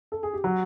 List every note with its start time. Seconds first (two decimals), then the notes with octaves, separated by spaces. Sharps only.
0.12 A4
0.23 G#4
0.33 G4
0.44 F#3 F#4